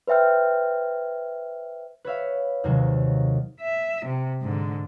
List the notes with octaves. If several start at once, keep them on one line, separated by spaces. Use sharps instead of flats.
B4 C5 E5 G5 F6
B4 C#5 E5 F5
D#2 C3 D#3 F#3 A#3
E5
C3
G#2 D3